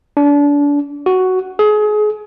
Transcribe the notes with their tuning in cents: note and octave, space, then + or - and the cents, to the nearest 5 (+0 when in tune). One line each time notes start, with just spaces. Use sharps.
D4 -30
F#4 +5
G#4 +30